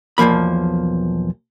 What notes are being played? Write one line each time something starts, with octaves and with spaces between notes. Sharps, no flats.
B1 E2 F3 A#3 B5